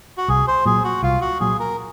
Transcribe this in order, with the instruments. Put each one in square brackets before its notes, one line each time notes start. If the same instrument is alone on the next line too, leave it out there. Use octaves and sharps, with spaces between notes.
[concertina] F#4
[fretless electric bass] C2 [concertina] G#4
[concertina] C5
[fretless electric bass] A#2 F#3 [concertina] G#4
[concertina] F#4
[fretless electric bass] C2 [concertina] F4
[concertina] F#4
[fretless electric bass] A#2 F#3 [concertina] G#4
[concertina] A#4